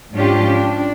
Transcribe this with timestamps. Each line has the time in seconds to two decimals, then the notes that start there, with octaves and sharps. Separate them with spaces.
0.13 G#2 F3 C#4 D4 F4 G4
0.47 D4